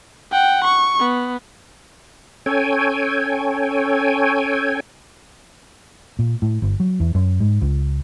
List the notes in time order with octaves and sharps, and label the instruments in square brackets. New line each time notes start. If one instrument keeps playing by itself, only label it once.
[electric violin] F#5 G5
C#6
B3
[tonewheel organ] C#4 A4 C#5 G5 G#5
[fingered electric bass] A#2
A2
G1
F#3
E2
F#2
G#2
C#2